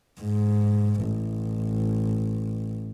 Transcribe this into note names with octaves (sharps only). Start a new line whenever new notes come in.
G#2
A1